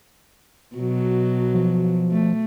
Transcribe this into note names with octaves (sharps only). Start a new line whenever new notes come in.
B2 F#3
F3
A3